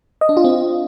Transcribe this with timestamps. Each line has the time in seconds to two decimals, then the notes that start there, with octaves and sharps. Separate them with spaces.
0.21 D#5
0.29 D4
0.37 F4
0.44 C4